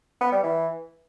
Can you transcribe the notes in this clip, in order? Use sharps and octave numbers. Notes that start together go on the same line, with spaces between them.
B3
G3
E3